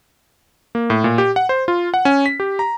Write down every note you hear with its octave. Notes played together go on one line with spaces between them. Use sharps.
A#3
A2
A#2
G4
F#5
C5
F4
F#5
C#4
B6
G4
A#5